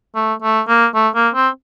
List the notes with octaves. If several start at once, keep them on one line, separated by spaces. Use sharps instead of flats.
A3
A3
A#3
A3
A#3
C4